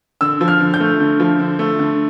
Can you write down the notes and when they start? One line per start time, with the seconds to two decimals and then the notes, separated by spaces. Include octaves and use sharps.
0.21 D3 E6
0.41 F3
0.48 F6
0.60 D3
0.74 G6
0.80 A3
1.00 D3
1.20 F3
1.40 D3
1.59 A3
1.79 D3